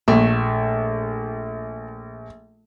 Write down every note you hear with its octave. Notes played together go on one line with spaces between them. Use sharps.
A#1 A3